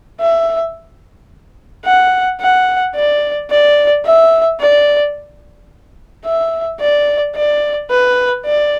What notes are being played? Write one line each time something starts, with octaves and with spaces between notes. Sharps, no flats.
E5
F#5
F#5
D5
D5
E5
D5
E5
D5
D5
B4
D5